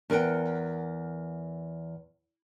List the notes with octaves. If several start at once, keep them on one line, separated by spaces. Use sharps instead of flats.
E2 A#4 B4 F#5 G5